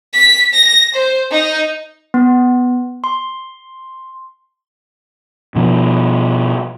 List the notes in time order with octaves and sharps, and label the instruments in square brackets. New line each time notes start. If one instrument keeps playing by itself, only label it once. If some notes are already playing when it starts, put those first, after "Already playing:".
[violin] B6
A#6
C5
D#4
[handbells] B3
C6
[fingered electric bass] B2 F3